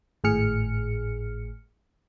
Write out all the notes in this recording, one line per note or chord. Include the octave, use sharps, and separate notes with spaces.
G#1 A2 G#4 F6 C#7